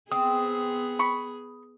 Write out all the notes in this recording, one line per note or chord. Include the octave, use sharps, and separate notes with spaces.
B3 C4 G#4 D#6
B5 C#6